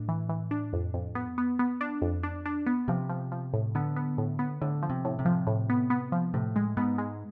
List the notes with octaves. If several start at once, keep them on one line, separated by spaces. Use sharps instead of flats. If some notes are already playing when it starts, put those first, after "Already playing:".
Already playing: A2 D4
E3
E3
D4
F2
F2
B3
B3
B3
D4
F2
D4
D4
B3
C3 F3
F3
F3
A2
D3 B3
B3
A2
B3
A2 D3
F3
C3
A2
C3
F3
A2
B3
B3
F3
A2 C3
G#3
G#2 B3
G#3